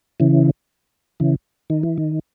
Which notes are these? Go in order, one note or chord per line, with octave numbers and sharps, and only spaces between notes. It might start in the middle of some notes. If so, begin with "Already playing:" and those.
C#3 E3
C#3 E3
D#3
E3
D#3